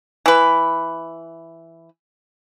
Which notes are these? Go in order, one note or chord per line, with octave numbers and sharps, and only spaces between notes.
E3 B4